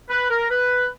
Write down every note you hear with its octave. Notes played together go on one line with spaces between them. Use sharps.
B4
A#4
B4